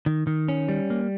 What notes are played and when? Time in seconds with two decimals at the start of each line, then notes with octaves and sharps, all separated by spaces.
0.06 D#3
0.27 D#3
0.48 C#4
0.68 G3
0.90 A#3